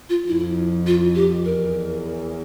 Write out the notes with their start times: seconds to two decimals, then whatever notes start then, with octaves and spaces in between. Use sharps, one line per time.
0.10 F4
0.28 F2 E4
0.87 F4
1.15 G4
1.45 E2 A#4